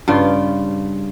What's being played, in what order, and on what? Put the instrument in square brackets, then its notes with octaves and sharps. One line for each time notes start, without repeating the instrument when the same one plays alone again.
[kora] G2 C#3 F4 G5